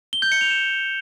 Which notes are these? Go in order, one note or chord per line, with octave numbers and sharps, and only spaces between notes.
G7
G6
C#7
F7
E7